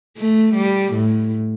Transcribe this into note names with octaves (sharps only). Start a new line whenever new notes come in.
A3
G3
A2